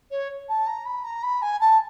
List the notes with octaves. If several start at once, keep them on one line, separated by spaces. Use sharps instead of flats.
C#5
A5
A#5
B5
A#5
B5
G#5
A5